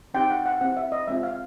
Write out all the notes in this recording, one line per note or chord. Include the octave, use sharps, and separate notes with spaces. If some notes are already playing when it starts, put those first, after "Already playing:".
C4 D#4 G4 G5
F#5
F#5
C4 E4 G4 F#5
E5
D#5
G#3 C4 F4 E5
F5